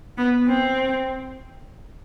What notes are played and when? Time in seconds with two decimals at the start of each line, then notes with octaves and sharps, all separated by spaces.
0.18 B3
0.47 C4